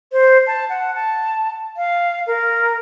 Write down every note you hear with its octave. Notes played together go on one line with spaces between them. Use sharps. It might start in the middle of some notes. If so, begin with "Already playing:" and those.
C5
A5
F#5
A5
F5
A#4